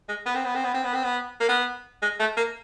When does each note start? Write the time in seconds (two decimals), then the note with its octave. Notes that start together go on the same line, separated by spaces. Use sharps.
0.08 G#3
0.26 B3
0.35 C4
0.45 B3
0.55 C4
0.64 B3
0.74 C4
0.84 B3
0.94 C4
1.04 B3
1.40 A#3
1.49 B3
2.02 G#3
2.19 A3
2.37 A#3